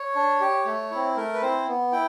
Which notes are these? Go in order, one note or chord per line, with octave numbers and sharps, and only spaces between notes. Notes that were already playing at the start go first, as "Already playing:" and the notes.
Already playing: C#5
D4
G4
A3
C4 E4
A3 A#4
B4
C4 E4 C5
B3
E4 G5